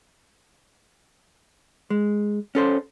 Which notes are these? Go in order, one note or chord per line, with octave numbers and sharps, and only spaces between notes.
G#3
C#4 A4 C5